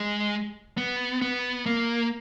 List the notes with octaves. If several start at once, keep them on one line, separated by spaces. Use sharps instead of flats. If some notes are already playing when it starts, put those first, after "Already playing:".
Already playing: G#3
B3
B3
A#3